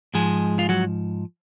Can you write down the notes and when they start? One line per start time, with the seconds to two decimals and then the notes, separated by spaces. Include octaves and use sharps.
0.14 G#2 F3 G#3 G#4
0.59 F4
0.69 F#3 F#4